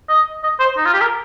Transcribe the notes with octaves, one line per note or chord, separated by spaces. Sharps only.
D#5
D#5
C5
D#4
F4
G4
A#4